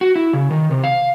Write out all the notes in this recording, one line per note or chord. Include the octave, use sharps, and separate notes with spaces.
F#4
E4
C#3
D#3
C3
F5